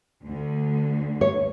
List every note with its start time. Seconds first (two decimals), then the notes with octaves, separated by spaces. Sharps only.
0.25 D2 D3
1.21 C#5